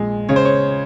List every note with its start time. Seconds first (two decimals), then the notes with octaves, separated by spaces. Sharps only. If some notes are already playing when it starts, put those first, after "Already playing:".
Already playing: A#1 G#3
0.29 C#3 C#5
0.36 C5
0.45 C#5